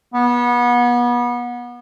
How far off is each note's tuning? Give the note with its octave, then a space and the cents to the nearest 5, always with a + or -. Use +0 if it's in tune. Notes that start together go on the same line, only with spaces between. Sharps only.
B3 -30